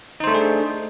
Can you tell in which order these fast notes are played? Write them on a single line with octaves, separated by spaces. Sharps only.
D#4 C5 A3 D4 G#4